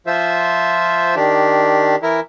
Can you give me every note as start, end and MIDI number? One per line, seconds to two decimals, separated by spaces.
0.07 1.15 53
0.07 1.15 65
0.07 1.15 72
0.07 1.15 76
1.16 1.96 51
1.16 1.96 62
1.16 1.96 67
2.03 2.20 52
2.03 2.20 64
2.03 2.20 70